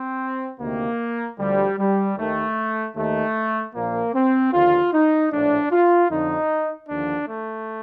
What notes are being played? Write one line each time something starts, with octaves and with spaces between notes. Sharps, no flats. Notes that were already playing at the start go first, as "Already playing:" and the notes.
Already playing: C4
D2 C3 D#3 A#3
D2 D3 F3 G3
G3
D#2 D#3 A3
D#2 D#3 A3
A#1 A#2 F3 A#3
C4
D#2 D3 F3 F4
D#4
A#1 A2 F3 D4
F4
F2 D3 F3 D#4
D#2 D3 F3 D4
A3